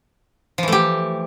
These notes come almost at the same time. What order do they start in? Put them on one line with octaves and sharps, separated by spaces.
F3 E3 A3 G4